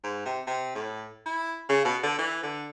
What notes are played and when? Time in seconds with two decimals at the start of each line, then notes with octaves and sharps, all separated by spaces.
0.04 G#2
0.25 C3
0.47 C3
0.75 A2
1.26 E4
1.69 C#3
1.85 B2
2.03 D3
2.19 E3
2.43 D3